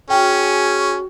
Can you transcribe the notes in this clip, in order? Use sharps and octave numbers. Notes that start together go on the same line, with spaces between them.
C#4 F#4 G#4 G5